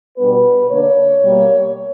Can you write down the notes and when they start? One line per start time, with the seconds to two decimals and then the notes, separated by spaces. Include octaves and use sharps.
0.17 B2 G3 B3 D4 B4
0.70 D3 A#3 D4 C#5
1.23 B2 G3 A#3